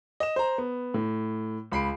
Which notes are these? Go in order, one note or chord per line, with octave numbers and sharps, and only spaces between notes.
D#5 E7
C5 A#5
B3
A2
C#2 B5 C7 D7